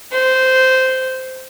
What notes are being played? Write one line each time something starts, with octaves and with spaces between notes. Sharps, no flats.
C5